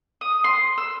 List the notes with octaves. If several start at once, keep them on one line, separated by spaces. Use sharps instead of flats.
D#6
C6
E6